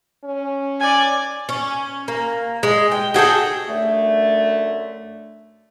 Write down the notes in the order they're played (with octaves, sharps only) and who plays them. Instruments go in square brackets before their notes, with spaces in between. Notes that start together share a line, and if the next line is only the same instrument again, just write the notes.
[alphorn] C#4
[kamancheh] D5 G#5
[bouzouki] C#4
A#3
G#3
G5
F#4 G#4 A4 G5
[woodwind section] F#2 D3 A3